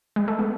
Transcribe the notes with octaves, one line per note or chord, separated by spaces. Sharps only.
G#3
A3
B3